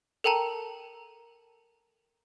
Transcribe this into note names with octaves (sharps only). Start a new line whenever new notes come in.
A4 A#4 G5 A5 A#5